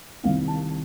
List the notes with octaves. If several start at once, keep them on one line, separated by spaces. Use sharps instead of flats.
C2 C3 D#3 F5
A5